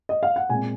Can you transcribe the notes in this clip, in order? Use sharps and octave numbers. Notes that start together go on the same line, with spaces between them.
D#5
F5
F#5
A#2 G#3 C4 G#5